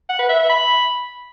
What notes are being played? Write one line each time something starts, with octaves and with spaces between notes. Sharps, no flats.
F#5
B4
E5
E5
B5